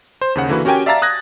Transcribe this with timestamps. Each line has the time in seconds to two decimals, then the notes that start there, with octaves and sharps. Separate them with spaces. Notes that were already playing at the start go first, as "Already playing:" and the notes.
0.21 C5
0.35 D#2 C#3 F#5
0.49 D3 E3 A#3 F#4 B4
0.65 C#4 F#4 G4 A#4 G5 G#5
0.86 D5 E5 F5 A5 A#5 A6
1.02 D#6 F#6 G#6 A#6